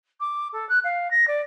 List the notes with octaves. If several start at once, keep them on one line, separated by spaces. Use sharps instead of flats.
D6
A4
F#6
F5
A#6
D5